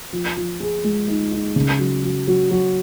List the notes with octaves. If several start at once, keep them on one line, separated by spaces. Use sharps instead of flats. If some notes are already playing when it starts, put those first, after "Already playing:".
F3
F3
G#4
G#3
D#4
D#4
C#3
F#3
F#3
F#3
F#3